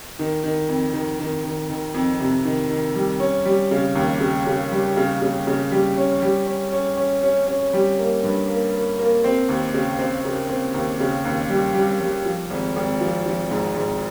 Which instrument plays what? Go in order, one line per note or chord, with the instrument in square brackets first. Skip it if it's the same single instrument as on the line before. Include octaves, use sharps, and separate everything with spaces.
[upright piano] D#3
D#3
F2
D#3
D#3
D#3
D#3
F2
C3
D#3
D#3
G3
C#4
G3
C#3
D#2
C#3
C#3
G3
C#3
C#3
C#3
G3
C#4
G3
C#4
C#4
C#4
C#4
C#4
G3
A#3
G2
A#3
A#3
A#3
C4
D#2
C#3
C4
C#3
C4
D#2
C#3
D#2
G3
G3
G3
F3
G#1
G#1
F3
F3
G#2
G#2